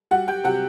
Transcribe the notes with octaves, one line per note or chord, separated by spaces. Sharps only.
G3 F#4 F#5
G4 G5
C3 F#4 F#5